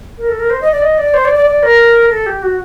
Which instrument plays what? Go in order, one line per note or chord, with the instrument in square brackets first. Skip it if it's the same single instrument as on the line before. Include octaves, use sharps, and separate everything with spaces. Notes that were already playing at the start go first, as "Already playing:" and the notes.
[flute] A#4
A4
A#4
C5
D#5
D5
D#5
D5
C5
D5
D5
D5
A#4
A4
G4
F#4